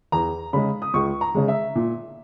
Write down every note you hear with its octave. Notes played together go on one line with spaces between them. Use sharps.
E2 A#5
C#3 G#3 B5
D#6
C#2 C#6
A#5
C#3 G#3
E5
A#2